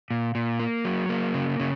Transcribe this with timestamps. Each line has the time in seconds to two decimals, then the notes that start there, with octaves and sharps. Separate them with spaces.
0.11 A#2
0.35 A#2
0.60 A#3
0.85 F#3
1.09 A#3
1.34 C#3
1.60 C#3